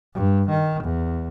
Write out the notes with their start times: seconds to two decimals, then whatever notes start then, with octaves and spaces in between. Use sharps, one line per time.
0.15 G2
0.49 D#3
0.84 E2